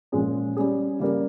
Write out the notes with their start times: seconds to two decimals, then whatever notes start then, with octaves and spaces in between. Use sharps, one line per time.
0.12 A#2 F3 G#3 C#4 G#4
0.57 G3 C#4 G#4
1.00 C#3 G3 A#3